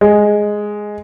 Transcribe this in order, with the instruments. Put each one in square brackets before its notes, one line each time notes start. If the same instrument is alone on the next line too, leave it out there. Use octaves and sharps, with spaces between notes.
[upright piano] G#3